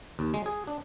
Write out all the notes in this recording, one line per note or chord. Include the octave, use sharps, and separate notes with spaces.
D#2
G#3
G#4
D4